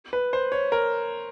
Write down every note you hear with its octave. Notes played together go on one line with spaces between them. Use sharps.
B4
C5
C#5
A#4